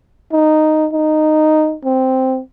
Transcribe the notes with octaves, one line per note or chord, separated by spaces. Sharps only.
D#4
D#4
C4